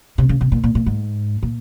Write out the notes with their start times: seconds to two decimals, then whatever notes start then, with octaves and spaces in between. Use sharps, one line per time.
0.18 C3
0.29 C#3
0.41 C3
0.52 A#2
0.64 A#2
0.75 A#2
0.86 G#2
1.43 A#2